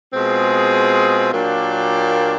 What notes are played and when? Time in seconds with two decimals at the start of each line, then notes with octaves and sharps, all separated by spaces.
0.13 B2 G#3 C4 F4 G#4
1.32 A#2 F#3 A#3 D4 G4